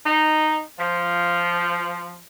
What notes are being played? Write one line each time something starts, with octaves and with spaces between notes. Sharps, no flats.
D#4
F3